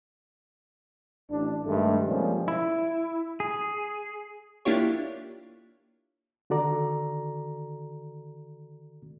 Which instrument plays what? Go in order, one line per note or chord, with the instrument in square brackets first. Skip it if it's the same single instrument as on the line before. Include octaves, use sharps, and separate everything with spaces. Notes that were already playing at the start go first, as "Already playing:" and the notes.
[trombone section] A1 D4
G2 D#3 G#3 A3
C3 F3 G3 G#3 A#3 C#4
[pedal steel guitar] E4
G#4
[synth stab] A#3 D4 E4 F4 G4 C#5
[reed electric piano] D3 D#3 F#4 A4 D5 A#5